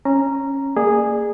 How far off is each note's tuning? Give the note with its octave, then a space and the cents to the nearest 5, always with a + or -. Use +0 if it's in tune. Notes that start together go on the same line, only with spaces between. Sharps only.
C#4 -15 A#5 +0
A#3 -20 G#4 -10 D5 +30